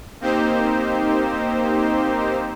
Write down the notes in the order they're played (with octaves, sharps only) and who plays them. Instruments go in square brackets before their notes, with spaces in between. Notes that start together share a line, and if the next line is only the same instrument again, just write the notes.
[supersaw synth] A#3 C4 D#4 G4 C5